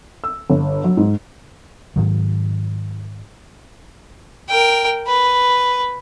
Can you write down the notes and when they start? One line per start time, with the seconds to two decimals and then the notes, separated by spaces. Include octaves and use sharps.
0.24 E6
0.50 G1
0.84 F#3
0.97 G#2
1.96 G#2 D#3 F#3
4.49 A#4 G5
5.07 B4